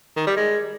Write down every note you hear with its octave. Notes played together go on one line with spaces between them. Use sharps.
D#3
G3
G#3